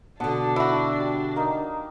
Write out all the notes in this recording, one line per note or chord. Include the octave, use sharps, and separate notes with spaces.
B2 D3 D4 F#5 A5 D#6
E4 F#4
G3
A#3 D#4